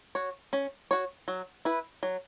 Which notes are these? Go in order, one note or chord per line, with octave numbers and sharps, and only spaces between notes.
F#4 C#5
C#4
F#4 C#5
F#3
E4 B4
F#3